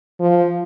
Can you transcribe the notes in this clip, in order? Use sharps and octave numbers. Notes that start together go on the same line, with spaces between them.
F3